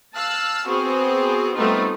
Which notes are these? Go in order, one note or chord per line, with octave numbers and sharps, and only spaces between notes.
F5 A5 E6 F#6
B3 C4 F#4 G#4
G3 A3 B3 C4 D#4 F4